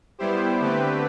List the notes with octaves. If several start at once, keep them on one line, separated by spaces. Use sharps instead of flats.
G3 B3 E4 G4 C5
D3 A3 C4 G4 B4